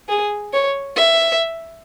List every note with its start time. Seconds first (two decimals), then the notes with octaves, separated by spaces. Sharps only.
0.09 G#4
0.53 C#5
0.96 E5